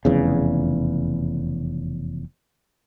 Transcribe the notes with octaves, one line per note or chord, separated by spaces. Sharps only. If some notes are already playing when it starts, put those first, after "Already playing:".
F1 E2 C#3